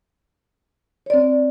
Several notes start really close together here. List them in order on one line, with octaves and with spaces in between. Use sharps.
C#5 D5 C4